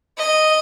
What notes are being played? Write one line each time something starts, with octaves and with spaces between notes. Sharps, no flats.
D#5